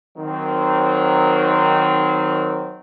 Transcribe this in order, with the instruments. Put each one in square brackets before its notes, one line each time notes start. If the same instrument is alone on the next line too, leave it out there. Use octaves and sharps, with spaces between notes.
[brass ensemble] D#3 F#3 C4